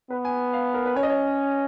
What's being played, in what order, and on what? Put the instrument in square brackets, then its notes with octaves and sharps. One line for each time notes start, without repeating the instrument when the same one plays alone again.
[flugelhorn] B3 [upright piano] B4
[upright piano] G#5
F5
A#4
B4
[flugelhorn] C#4 [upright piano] C#5
[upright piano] D#5
C#5